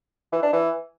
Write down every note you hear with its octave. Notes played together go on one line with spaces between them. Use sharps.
E3
D4
E3